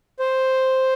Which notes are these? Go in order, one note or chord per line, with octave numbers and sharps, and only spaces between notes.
C5